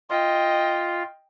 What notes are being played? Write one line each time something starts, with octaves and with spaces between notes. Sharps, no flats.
F4 D#5 G5